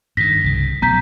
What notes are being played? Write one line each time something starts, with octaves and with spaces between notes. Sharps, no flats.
G2 D#3 A#6 B6
C2 C#3
B2 F#3 B3 A#5 G6 B6